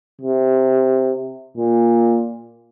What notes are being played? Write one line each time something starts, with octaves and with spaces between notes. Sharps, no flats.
C3
A#2